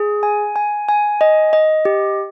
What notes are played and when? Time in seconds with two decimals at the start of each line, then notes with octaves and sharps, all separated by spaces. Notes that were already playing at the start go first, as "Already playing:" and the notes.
Already playing: G#4
0.23 G#5
0.56 G#5
0.89 G#5
1.21 D#5
1.53 D#5
1.85 G4